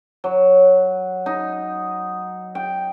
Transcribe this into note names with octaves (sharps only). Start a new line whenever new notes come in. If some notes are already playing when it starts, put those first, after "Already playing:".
F#3
D#4
G5